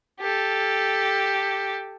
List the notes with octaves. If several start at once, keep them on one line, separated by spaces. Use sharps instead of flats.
G4 A4